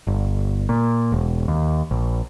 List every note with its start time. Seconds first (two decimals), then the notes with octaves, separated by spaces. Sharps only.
0.07 G1
0.69 A#2
1.12 E1
1.48 D#2
1.91 A#1